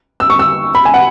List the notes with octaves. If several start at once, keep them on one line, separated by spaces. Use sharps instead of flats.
E6
C#6
E6
B5
G#5
F#5